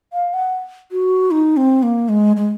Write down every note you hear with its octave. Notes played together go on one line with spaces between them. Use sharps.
F5
F#5
F#4
D#4
C4
A#3
G#3
G#3